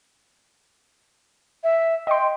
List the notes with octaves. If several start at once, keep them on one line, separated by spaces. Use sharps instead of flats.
E5
D#5 G5 C6